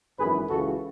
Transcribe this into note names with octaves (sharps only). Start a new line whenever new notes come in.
G#1 F#2 E3 G#4 B4
C#2 C#3 E3 F#4 A4